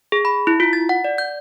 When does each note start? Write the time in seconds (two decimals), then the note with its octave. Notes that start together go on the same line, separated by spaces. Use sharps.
0.12 G#4
0.25 B5
0.47 E4
0.60 F4
0.73 A6
0.89 F#5
1.04 D5
1.18 G6